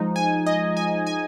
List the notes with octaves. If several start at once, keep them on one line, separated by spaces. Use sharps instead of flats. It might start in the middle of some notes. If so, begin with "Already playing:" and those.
Already playing: F3 G#3 D#4
G#5
D#5
G#5
G#5